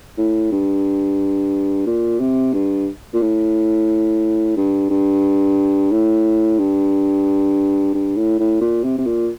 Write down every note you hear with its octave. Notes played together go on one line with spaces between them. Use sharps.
A2
G2
A#2
C3
G2
A#2
A2
G2
G2
A2
G2
G2
A2
A2
A#2
C3
C3
A#2